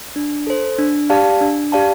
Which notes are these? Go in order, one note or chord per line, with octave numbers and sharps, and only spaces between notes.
D4
A4 C5
D4
G4 D5 F5 A5
D4
G4 D5 F5 A5